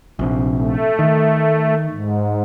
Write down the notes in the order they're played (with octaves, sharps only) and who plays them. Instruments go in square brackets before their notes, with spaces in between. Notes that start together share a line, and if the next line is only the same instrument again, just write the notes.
[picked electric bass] A#1 C3
[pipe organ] A3
[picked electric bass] D#3
[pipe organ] G#2